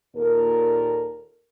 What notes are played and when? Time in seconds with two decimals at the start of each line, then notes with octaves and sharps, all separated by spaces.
0.16 D#2 A#2 A4 A#4